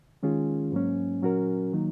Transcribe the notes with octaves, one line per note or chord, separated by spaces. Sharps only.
D#3 G#3 C#4 F4 G#4
G#2 F#3 A#3 C#4
A#2 F#3 C#4 F#4 A#4
D#3 F#3 A#3 D#4